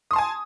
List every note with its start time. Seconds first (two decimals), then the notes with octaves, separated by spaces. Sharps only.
0.11 D#6
0.13 C6
0.16 A5
0.18 G#5